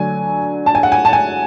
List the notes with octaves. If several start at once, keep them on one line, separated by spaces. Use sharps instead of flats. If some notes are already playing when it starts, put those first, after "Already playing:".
Already playing: D3 F#3 A3 D4 G#5
A5
G#5
F#5
G#5
A5
G#5